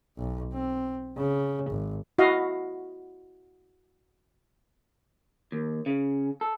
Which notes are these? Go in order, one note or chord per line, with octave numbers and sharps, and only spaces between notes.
B1
C4
C#3
G#1
E4 F#4 D#5 F5
D#2
C#3
A4